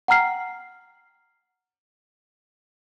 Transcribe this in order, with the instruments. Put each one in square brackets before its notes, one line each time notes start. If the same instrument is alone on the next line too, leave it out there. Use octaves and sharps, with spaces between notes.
[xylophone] F#5 G5 A#5 F6 C7